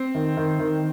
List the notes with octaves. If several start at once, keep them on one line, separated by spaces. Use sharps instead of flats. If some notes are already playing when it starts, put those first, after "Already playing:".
Already playing: C4
D#3
D#3
D#3